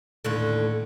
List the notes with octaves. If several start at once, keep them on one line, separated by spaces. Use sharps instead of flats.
D#2 A2 D3